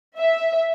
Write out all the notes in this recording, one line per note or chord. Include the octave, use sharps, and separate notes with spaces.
E5